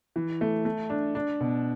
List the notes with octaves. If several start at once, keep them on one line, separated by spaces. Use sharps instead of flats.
E3
A3
A3
D4
D4
B2